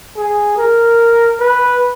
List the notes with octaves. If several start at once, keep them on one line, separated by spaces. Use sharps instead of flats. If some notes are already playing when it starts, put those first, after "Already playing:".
G#4
A#4
B4